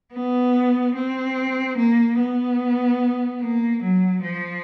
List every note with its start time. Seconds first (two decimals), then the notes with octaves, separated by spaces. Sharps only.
0.14 B3
0.95 C4
1.77 A#3
2.19 B3
3.41 A#3
3.82 F#3
4.23 F3